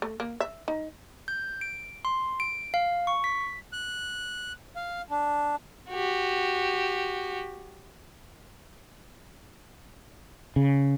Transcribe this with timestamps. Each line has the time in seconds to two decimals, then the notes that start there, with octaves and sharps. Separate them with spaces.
0.02 A3
0.20 A#3
0.40 E5
0.68 D#4
1.28 G6
1.61 D7
2.05 C6
2.40 D7
2.74 F5
3.07 C#6
3.24 B6
3.73 F#6
4.76 F5
5.10 D4
5.90 F#4 G4
10.56 C#3